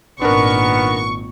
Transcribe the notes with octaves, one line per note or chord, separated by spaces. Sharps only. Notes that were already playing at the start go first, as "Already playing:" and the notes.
G#1 A#2 B3 D4 A#4 C#6